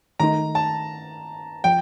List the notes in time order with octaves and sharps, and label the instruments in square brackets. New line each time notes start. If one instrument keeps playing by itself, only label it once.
[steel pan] D#3 A3 D#4 [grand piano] A#5
[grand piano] A5
[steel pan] F3 [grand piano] G5